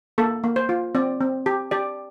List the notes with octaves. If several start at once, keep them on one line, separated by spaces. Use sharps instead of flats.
A#3 A4
A#3
C5
F4
C4 D5
C4
G4
G4 D5